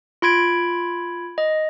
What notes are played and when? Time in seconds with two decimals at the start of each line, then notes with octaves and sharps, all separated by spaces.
0.22 F4 B5 G#6 D7
1.38 D#5